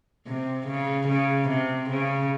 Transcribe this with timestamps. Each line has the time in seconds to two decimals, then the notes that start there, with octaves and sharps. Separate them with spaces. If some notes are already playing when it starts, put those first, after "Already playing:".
0.27 C3
0.67 C#3
1.08 C#3
1.49 C3
1.90 C#3